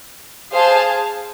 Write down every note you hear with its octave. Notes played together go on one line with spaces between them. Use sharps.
G#4 C5 F5 A5